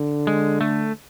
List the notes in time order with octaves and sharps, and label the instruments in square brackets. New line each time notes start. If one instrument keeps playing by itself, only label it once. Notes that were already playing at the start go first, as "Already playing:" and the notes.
Already playing: [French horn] D3
[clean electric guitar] G#3
A3